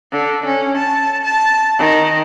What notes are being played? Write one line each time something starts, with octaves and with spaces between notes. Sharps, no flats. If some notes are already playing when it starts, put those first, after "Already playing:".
D3
C#4
A5
A5
D#3